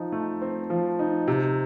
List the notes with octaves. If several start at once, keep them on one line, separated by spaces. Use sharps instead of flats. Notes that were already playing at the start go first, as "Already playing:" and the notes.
Already playing: F3 D#4
A3
C4
F3
D#4
C3